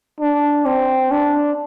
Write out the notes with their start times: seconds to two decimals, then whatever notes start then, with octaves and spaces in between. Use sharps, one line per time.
0.20 D4
0.66 C4
1.11 D4